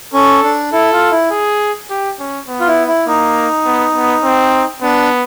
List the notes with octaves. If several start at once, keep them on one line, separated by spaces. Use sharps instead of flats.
C#4 A4
D4
E4 A4
F4
E4
G#4
G4
C#4
B3
F4
E4
E4
A#3 D#4
B3
B3
C4
B3 D4